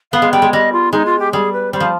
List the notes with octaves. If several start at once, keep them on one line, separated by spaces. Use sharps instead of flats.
B3 F5
G#3
G3 G5
G#3
G3 D#5
F4
G#3 D#4
F4
G4
G3 G#4
B4
G3 C5
F3